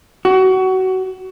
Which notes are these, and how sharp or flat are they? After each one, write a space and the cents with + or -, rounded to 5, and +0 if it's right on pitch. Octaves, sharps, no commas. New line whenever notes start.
F#4 +25